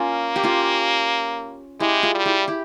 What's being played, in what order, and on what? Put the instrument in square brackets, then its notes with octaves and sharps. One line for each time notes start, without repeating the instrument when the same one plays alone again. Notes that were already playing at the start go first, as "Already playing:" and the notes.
Already playing: [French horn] A#3 [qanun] C#4 F4
[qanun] G4
C#4 F4
[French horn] G#3 [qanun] E4 G4
[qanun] F4 G#4
[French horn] G3
[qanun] E4 G4
E4 G4